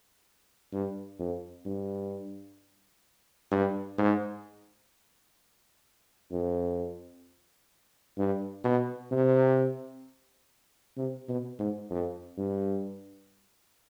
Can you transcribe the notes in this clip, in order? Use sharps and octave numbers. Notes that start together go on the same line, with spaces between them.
G2
F2
G2
G2
G#2
F2
G2
B2
C3
C3
B2
G#2
F2
G2